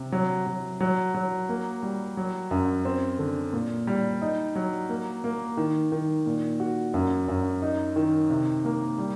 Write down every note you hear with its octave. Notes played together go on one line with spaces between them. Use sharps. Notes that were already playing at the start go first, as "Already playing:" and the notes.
Already playing: C3
F#3
F#3
F#3
F#3
A#3
G3
F#3
F#2
C4
D3
A#2
G3
D#4
F#3
A#3
A#3
D#3
D#3
A#2
F#4
F#2
F#2
D#4
D#3
C3
A#3
G3